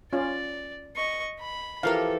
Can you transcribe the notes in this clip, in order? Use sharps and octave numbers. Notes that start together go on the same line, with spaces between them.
C#4 F4 D5
D#5 C#6
B5
E3 F3 G4 A4 A#4 F5